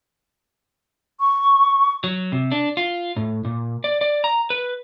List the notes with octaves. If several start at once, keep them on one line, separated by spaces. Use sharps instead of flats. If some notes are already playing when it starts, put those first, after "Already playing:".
C#6
F#3
C3
D4
F4
A2
A#2
D5
D5
A#5
B4